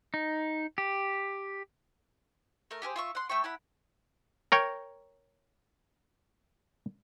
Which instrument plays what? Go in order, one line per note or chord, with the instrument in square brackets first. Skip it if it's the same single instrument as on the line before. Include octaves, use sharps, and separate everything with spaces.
[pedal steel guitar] D#4
G4
[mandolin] A3 A#4
G4 G#4 A#4 C5
F4 E5 C#6
F#5 C6
A3 E5 G5 C#6
E4 F#5 B5
[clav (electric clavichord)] A#4 C#5 G5